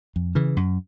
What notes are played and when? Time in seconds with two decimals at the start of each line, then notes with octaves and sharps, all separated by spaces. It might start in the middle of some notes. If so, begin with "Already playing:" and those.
0.16 F2
0.35 C#3 E3
0.57 F#2